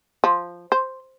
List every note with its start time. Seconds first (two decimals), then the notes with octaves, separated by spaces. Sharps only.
0.24 F3
0.72 C5